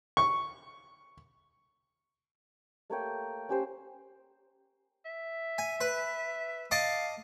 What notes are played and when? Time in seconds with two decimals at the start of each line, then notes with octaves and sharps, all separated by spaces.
0.17 C#6
2.90 A3 A#3 C#5 G5
3.49 C#4 G4 C5
5.06 E5
5.58 G#5
5.81 B4
6.71 D#5 F5 A5 D6